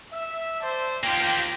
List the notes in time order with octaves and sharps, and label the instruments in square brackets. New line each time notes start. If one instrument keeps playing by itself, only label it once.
[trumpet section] E5
C5 D5 A5
[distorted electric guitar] A#3 G4 [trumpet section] F4 G5